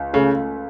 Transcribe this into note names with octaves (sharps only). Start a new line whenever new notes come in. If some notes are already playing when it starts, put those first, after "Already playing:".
Already playing: C#2
C#3 A3